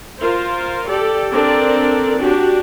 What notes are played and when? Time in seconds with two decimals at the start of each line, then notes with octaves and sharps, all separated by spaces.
0.19 F4 A#4 C5
0.88 G4 A4 D5
1.33 C4 D4 A4 A#4 D5
2.20 D4 F#4 G4